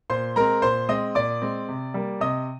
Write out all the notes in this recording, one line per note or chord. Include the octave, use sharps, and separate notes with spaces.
A#2 C5 C6
G#3 C4 A#4 A#5
A#2 C5 C6
G#3 C4 D#5 D#6
A#2 D5 D6
G#3 C4
C3
G3 A#3
C3 D#5 D#6